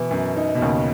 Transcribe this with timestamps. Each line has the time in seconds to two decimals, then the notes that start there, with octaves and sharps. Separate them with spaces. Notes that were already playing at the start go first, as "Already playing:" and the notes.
Already playing: B2 E3
0.11 F#2
0.37 D#4
0.55 B2
0.62 D#2 C#3